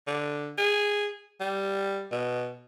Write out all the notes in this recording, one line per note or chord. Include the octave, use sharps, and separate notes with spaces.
D3
G#4
G3
B2